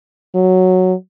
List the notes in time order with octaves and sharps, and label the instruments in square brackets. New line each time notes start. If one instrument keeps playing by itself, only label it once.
[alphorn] F#3